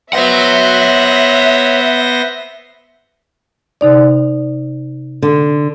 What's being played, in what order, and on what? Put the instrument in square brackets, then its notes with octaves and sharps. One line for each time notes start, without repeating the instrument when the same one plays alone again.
[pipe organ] B3 C5 A#6 [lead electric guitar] C#5 F#5 [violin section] E5
[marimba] C3 D#4 D5
[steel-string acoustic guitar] D3